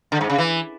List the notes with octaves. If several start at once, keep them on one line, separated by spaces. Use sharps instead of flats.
D3
G#2
C#3
E3